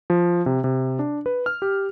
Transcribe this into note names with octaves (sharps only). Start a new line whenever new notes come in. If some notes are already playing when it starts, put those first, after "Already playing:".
F3
C3
C3
D4
B4
F6
G4